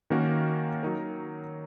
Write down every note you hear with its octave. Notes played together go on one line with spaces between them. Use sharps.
D#3 A#3 C#4 F#4 A#4
F#3 D#4 A#4